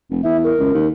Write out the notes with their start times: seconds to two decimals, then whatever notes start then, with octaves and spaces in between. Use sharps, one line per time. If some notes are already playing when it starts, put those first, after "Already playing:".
0.11 F1
0.24 E2 E5
0.44 A#4
0.59 C#2
0.74 D#2